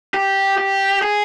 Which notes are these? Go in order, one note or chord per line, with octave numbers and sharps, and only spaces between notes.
G4
G4
G#4